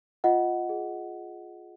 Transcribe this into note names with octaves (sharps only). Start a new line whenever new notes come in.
F4 D#5 F#5
G#4